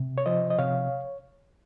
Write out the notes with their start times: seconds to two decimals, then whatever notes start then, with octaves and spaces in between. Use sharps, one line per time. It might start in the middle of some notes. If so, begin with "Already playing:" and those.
Already playing: C3
0.18 C#5
0.26 F3 C5 D#5
0.50 D#5
0.58 C3 C#5 F5